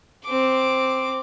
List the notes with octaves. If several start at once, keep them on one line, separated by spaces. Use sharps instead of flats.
C4 D6